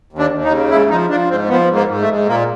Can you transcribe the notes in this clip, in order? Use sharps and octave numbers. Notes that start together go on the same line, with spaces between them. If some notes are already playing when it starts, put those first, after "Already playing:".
D#2
D4
D#2
D#4
C#3
G#2 E4
F3 D#4
F3 D4
G#2 C4
F3 B3
G#2
A#3
G#2
A3
G#2
A#2 A#3